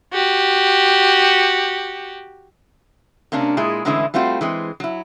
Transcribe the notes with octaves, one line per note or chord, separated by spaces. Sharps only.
F#4 G4
C3 A#3 C#4 D4
A#2 G#3 E4 G#4
A2 D3 E3 G#3 C#4 E4
G3 A3 C4 F4 F#4
E3 G#3 C4
F#3 E4